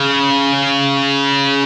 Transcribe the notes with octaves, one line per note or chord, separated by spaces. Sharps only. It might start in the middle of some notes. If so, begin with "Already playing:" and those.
Already playing: C#3